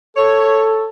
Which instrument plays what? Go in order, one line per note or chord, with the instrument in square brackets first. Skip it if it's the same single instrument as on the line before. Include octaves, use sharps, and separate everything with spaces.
[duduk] A4 [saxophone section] C#5